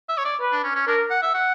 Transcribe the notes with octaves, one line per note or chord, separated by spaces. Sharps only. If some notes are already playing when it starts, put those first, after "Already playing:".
E5
C#5
D5
B4
D4
C#4
C#4
D4 A#4
F#5
E5
F#5